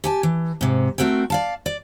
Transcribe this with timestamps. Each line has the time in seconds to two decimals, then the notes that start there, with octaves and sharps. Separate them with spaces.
0.04 G4 G#5 A5
0.23 E3
0.61 G#2 C3
0.98 A3 C4 F#4 A#4 G5
1.30 D5 F5 A5
1.66 D5